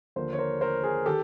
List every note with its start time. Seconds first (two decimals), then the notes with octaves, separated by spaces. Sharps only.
0.16 D#2 D3 F3 A#4 C5
0.33 C#5
0.38 A#4 C5
0.61 A#4 C5
0.83 G#4 A#4
1.06 D#3 G4 A4